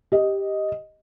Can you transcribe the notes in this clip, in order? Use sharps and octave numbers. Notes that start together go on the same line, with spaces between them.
G4 D#5